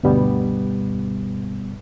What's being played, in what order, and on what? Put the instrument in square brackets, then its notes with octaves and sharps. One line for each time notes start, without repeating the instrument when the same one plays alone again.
[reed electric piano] D2 G2 B2 G3 B3